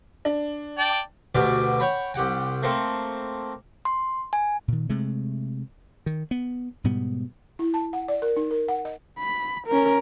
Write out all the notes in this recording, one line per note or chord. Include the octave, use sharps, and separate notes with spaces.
D4
D5 G5 A5
D2 B2 D3 G4 D5
C#5 F#5 G5 B5
C2 G4 F#5 G5
A3 A#3 C4 A4
C6
G#5
A#2 D#3
C3 G#3 A3
D#3
B3
G#2 B2 G3 B3
E4
A5
F#5
D5
A#4
D#4
A#4
F#5
D#5
B5
C#4 A#4